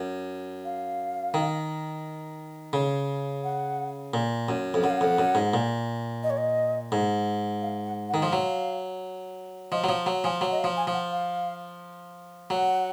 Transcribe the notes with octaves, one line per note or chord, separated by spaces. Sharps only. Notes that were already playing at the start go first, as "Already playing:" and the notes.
Already playing: F#2
F5
D#3
C#3
F#5
A#2
F#2
F2
F#2 F#5
F5
F2 F#5
F#2
G#2
A#2
D#5
C#5
D#5
G#2
F5
F#5
F#5
D#3
F3
F#3 F5
F3 D#5
F#3
F3 F#5
F#3 F#5
F3 G#5
F#3 F#5
D#5
F5
F3
G#5
F3
F#5
F5
F#3 F#5